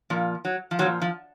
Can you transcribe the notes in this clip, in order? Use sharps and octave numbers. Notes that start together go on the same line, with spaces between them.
A#2 F3
F#3
F3
A#2 F3 F#3
F3